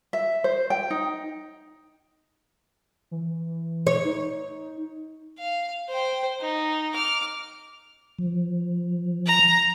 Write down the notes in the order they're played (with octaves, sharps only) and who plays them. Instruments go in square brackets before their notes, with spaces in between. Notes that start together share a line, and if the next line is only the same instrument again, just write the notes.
[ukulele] E5
C5
G5
D#4
[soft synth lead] E3
[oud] C#5
[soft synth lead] D#4
[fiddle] F5
C5 G5
D#4
D6 F6
[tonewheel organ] F3
[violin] A#5